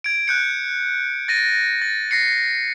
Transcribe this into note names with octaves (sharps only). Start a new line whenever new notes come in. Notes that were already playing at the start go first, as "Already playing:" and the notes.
G#6 D7
F#6 G6 C#7
A6 A#6 D#7
A6
A#6 C7 C#7